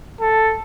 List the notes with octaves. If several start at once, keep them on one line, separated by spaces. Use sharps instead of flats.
A4